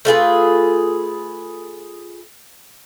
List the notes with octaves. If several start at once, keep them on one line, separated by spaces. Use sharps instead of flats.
A3 F4 G#4 B4